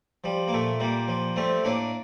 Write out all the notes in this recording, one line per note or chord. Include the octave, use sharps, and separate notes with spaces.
F3 G3
A#3
A#2 A3
A#2 G3 A#3
F3
G3 A3 C4
A2 A#3 D4